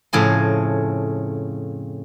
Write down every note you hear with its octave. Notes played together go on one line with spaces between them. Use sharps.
F2 A2 C#3 G#4 C6